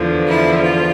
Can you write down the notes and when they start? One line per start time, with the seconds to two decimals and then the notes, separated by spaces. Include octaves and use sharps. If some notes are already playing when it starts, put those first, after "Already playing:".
Already playing: E2 D3 F3
0.26 E4
0.62 F4